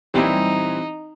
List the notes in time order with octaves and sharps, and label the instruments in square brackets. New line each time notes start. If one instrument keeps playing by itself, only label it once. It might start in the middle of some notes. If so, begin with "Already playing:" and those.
[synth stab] B1 A#2 G3 [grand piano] E3 C4 E4 [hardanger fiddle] D#4